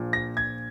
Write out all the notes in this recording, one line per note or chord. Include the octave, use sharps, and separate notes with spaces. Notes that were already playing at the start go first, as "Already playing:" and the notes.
Already playing: A#1 A#2 F3
A#6
G#6